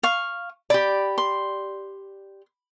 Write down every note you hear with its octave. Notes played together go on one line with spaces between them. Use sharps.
F5 C#6
G4 D5 B5
C6